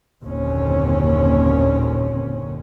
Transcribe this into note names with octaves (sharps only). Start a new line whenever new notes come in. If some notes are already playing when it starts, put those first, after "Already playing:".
F#1 D#2 A#2 D3 C4 C#4